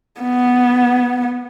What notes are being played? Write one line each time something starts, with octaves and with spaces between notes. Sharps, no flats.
B3